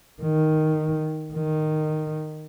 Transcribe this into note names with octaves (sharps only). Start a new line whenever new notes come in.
D#3
D#3